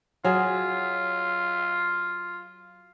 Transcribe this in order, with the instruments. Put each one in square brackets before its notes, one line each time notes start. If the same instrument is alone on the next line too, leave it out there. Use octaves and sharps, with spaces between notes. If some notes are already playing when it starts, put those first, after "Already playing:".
[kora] F#3 G#4 [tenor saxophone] F4